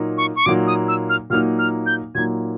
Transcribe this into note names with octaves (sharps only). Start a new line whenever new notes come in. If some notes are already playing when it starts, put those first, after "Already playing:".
Already playing: A#2 F#3 A#3 D#4
C#6
C#6
A#2 F#3 A#3 D#4 D6
D#6
E6
F6
A#2 F#3 A#3 D#4 F6
F6
G6
A#2 F#3 A#3 D#4 G#6